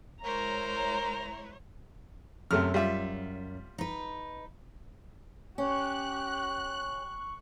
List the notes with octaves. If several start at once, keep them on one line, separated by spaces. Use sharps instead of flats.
G#3 E4 A#4 C5 C#5 A#5
F#2 C3 A3 F6
G3 F4 E5
D#4 B4
C#4 G4 C#6 F#6